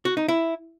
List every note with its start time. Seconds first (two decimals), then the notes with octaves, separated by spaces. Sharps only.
0.05 F#4
0.17 D#4
0.28 E4